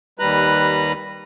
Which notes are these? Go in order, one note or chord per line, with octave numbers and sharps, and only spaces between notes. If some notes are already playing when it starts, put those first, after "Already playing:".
D#2 G3 B4 A#5 F#6